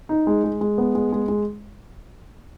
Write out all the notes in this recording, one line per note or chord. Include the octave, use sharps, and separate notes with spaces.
D#4
G#3
G#3
G#3
B3
G#3
G#3
G#3